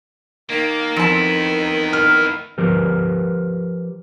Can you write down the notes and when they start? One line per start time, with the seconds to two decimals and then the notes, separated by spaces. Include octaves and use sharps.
0.50 D#3 A#3
0.96 F2 B3 E4 A5
1.93 F6
2.58 F3 G4 A#4 B4